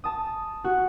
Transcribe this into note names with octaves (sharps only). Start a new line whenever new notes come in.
A5 D#6
F#4